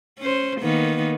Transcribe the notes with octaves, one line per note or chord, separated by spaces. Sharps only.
C#4 C5
D#3 A#3 B3